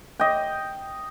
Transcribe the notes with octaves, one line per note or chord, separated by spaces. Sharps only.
D#5 G5